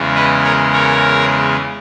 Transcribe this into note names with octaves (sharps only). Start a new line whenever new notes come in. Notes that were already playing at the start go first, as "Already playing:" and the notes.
Already playing: E2 C#3 G#3
B4 D#5
A#4 C#5
A#4 C#5